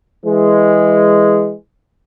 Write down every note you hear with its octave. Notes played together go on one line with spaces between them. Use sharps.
E3 G#3